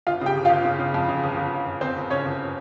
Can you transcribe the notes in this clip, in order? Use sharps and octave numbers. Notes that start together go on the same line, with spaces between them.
G1 F4 F5
C#3 G4 G5
G1
F4 F5
G1
C#3
C#3
F2
C#3
G1
G1
G1
G1
G1 C4 C5
G1
C#3 C#4 C#5
G1